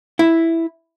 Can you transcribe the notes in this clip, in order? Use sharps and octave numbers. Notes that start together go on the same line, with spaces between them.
E4